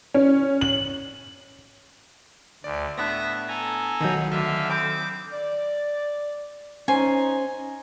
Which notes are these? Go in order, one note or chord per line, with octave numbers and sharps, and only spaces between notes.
C#4
F#7
D2 D5
A2 B3 D4 E5 A5 A#6
A4 G#5 A#5
B1 D#3 F#3 D#5 G6
D2 D3 E5 F5
C4 A4 B5 D6 D#6
D5
C#4 D#4 C5 G#5